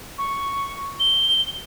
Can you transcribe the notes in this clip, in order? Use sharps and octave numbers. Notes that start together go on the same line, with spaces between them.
C#6
G7